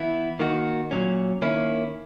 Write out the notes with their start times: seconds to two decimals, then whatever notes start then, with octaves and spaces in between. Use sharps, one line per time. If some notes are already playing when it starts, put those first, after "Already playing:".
Already playing: E3 B3 E4
0.39 D#3 A#3 D#4 F#4
0.91 A#2 F#3 C#4
1.42 D#3 A#3 C#4 E4